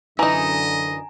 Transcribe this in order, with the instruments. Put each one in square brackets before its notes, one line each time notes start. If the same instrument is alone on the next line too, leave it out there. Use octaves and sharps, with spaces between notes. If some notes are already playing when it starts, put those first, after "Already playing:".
[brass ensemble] F#2 D3 [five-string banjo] E3 D#4 [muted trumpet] D#5 [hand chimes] G#5 A#5